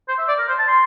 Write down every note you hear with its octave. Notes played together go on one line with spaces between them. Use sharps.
C5
E5
D5
A#4
C5
A5
C6